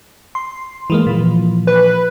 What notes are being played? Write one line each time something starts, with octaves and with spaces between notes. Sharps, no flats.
C6
E3 G#3 A#3
A#2 E3 F3
B4